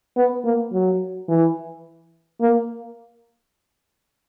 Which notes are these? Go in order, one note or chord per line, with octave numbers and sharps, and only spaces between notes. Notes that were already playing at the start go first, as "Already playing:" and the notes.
B3
A#3
F#3
E3
A#3